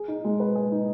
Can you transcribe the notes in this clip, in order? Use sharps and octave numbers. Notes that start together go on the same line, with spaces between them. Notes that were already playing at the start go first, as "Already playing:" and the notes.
Already playing: G#4
D#4
G#3
B4
G#4
D#4